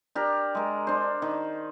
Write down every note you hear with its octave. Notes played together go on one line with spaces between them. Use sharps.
D4 G4 A#4
G#3 A#4
D4 C5
D#3